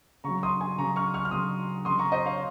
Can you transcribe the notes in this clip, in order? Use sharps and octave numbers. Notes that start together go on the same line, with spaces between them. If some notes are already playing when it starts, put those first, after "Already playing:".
C#3 F#3 A#5 C#6
C6 D#6
G#5 C6
C#3 F#3 A#5 C#6
C#6 F6
C#6 F6
F6
C#3 F#3 C6 D#6
C#3 F#3 C6 D#6
A#5 C#6
C5 D#5
C#5 F5